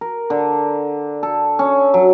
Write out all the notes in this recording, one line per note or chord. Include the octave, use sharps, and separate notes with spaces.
A#4
D3
A4
C#4
F#3